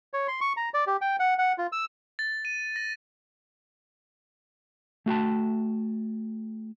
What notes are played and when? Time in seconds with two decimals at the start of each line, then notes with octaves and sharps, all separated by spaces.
0.13 C#5
0.28 C6
0.41 C#6
0.57 A#5
0.74 D5
0.87 G4
1.01 G5
1.20 F#5
1.38 F#5
1.58 F4
1.72 E6
2.19 A6
2.45 D#7
2.76 A#6
5.06 A3 F#4 G5 A5